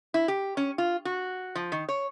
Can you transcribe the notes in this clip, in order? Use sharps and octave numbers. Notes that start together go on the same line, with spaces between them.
E4
G4
C#4
F4
F#4
F3
D#3
C#5